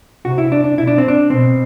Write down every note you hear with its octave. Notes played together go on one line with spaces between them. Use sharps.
C3 F#4
E4
D4
D4
B2 E4
D4
C4
D4
B2 C4